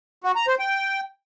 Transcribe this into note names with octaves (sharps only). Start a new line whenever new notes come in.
F#4
A#5
C5
G5